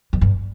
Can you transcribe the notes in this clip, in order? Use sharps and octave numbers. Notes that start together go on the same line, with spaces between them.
F2
G2